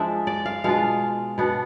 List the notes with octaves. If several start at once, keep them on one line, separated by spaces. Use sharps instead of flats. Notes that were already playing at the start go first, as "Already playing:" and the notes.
Already playing: F3 G#3 D4 E5
D5
F5
B2 G#3 D4 F4 F5
B2 B3 D4